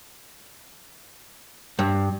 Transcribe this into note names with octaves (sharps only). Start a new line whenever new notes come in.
G2